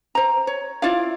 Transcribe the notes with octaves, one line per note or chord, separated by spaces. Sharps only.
C5 A#5
C#5
E4 F4 D5 F5